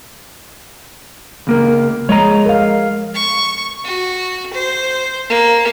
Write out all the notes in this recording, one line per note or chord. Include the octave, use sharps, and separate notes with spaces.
C#2 A#3 A#4
F3 G#3 C#5 D#5 A#5
A#4 F5
C#6
F#4
C5
A#3